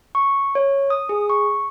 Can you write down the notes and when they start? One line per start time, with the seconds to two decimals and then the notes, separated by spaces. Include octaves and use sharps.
0.15 C#6
0.55 C#5
0.90 D#6
1.09 G#4
1.30 C#6